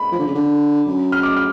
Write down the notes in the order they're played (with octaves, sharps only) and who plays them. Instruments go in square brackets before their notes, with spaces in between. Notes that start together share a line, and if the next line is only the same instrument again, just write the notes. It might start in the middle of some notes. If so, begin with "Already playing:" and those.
Already playing: [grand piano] B5
[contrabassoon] F3
D3
C#3
D3
F#2
[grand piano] F6
D6
F6